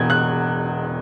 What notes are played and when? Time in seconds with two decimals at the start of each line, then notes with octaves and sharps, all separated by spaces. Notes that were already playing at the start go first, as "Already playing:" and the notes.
Already playing: E1 E2 B2 G#6
0.10 F#6